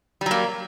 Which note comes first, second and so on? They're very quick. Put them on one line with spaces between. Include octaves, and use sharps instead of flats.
G3 F#3 A#3